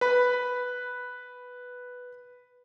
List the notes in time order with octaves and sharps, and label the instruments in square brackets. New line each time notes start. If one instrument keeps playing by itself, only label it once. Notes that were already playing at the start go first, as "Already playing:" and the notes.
[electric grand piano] B4 B5